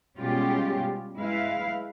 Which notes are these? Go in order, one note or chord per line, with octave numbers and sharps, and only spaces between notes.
B2 G3 G#3 C#4 F4 G4
G#3 E4 B4 F5